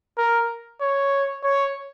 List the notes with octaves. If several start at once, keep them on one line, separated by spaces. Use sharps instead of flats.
A#4
C#5
C#5